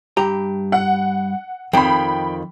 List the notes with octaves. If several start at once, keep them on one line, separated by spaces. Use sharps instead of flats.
G2 G4 A#5
F#5
F2 D#3 G5 B5